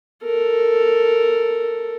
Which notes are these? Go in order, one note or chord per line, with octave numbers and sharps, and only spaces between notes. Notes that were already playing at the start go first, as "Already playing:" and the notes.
A4 A#4